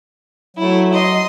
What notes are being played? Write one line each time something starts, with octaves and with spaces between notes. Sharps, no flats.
F#3 A3 E4
D#5 C6